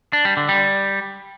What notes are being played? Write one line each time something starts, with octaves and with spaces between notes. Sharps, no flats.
D4
G3
D3
G3